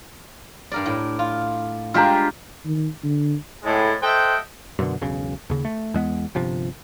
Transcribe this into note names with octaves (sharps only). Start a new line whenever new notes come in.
G2 A#4 D5
A2
F4
G3 G#3 D4 F4 G4 A#5
D#3
D3
A2 G#3
A4 C5 D#5 E5 F#5 G5
F#2 B2 D3
E1 B1 C#3
D#2 C#3
A3
E2 G#3 B3
G1 C3 F3